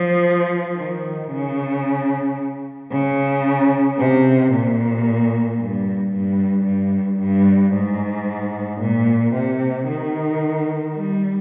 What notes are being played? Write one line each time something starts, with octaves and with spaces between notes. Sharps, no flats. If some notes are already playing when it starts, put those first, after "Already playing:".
Already playing: F3
D#3
C#3
C#3
C3
A#2
G2
G2
G2
G2
G#2
A#2
C3
D#3
G3